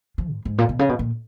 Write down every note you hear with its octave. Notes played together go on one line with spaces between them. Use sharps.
F3
G#2
G#2
A#2
B2
C#3
B2
A#2